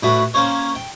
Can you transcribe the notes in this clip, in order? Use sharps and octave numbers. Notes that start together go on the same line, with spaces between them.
A2 D4 F#4 B4 B5
A#3 C#4 C5 C#5
G5